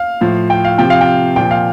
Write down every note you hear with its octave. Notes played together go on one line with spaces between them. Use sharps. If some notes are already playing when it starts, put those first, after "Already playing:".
Already playing: F5
A2 F3
G5
F5
C3 F3 G5
F5
G5
A#2 F3 G5
F5